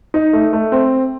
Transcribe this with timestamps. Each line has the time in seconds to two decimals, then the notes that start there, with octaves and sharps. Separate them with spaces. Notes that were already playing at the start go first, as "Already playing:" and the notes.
0.14 D#4
0.33 A3
0.53 A3
0.72 C4